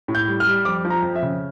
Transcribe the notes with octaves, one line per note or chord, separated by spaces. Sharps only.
A2
G6
G3
F6
G3
F2 D6
F3
A#5
F2
E5
C#3